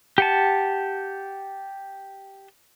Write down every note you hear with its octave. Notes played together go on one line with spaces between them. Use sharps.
G4 F#5 A5